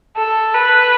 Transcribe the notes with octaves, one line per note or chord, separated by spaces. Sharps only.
A4
B4